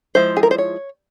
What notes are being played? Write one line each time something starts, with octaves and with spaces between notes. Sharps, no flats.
F3 G#3 E4 C5
G#4
A#4
C5
C#5